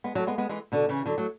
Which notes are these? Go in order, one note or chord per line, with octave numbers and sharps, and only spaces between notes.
G#3 B3
F#3 A3
G#3 B3
G#3 B3
E3 G#3
B2 D3
C#3 E3
D3 F#3
F#3 A3